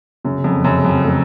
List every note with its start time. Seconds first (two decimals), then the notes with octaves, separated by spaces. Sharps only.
0.24 F#2 C#3
0.44 F2
0.64 F#2 C#3
0.85 F2
1.05 A3